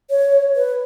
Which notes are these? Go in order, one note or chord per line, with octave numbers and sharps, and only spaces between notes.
C#5
B4